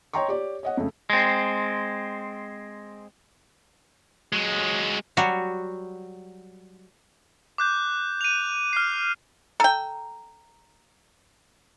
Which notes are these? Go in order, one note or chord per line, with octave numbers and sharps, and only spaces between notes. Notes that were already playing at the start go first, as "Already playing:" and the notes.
C#5 D#5 G5 A#5 C6 C#6
G4 C#5 D5
C#5 D#5 F#5
F2 C#3 A3
G#3 C4
F#3 G#3
F#3 G3 F#4
D6 F#6 G6
D#7 F7
F6 C7
A4 G5 A#5